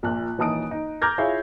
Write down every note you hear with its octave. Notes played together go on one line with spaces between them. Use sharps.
A#1 A#2 F#6
D#1 E3 D#4 A5 D#6 D7
D#4
A#5 D6 F6 G6 G#6 A#6
E4 F4 G#4 C#5 E5 F5